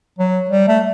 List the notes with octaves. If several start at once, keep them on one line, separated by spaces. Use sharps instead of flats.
F#3
G3
A3